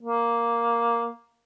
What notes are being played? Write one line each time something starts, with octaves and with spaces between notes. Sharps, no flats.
A#3